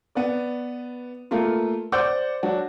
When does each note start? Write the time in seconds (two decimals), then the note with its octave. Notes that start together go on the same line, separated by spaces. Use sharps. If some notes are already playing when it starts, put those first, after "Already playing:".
0.15 B3 B4 D5
1.31 A3 A#3 F4
1.92 C5 D5 F#5 D6 G6
2.43 F#3 D4 F#4